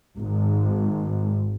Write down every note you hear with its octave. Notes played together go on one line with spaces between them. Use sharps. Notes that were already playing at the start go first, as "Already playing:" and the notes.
G#1